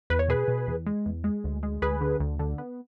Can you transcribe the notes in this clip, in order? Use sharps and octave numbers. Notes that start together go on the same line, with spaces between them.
E2 B4
C#5
B2 G#4 B4
B2
E2
G#3
E2
G#3
D2
G#3
D2 G#4 B4
D3
D2
D3
B3